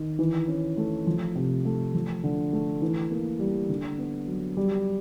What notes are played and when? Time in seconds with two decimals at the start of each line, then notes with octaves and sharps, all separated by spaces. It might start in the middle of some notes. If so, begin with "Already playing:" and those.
Already playing: D#3
0.19 E3
0.48 C#4
0.77 A3
1.07 F3
1.35 C3
1.65 A3
1.94 F3
2.24 D3
2.53 A3
2.82 E3
3.11 A#3
3.40 G3
3.69 D3
3.98 B3
4.28 F#3
4.57 G3